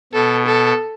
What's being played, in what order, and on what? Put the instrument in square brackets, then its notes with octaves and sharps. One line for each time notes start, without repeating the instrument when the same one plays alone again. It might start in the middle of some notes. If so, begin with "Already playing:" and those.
[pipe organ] B2 [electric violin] A4
[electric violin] A4